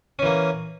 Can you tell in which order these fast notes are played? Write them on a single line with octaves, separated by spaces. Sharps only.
C#4 E3 A#3